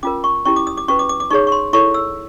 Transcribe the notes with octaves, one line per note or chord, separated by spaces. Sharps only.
C#4 F4 A#4 D6
C#6
C#4 E4 G4 C#6
D6
D#6
D6
C#4 F#4 B4 C#6
D6
D6
D6
D#4 G#4 C#5 C#6
C#6
C6
E4 A4 C#5 C#6
E6